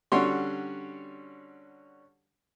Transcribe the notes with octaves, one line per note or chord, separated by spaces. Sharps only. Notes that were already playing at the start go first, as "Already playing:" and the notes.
D3 G3 C#4 F#4 C#5 C6